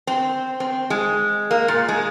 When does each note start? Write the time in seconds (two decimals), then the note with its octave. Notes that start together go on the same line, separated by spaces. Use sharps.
0.07 C4
0.60 C4
0.90 G#3
1.51 A#3
1.68 A#2
1.88 G#3